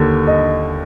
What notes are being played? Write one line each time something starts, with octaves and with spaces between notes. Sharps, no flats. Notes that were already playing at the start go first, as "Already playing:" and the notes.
Already playing: D#2 D3
D#5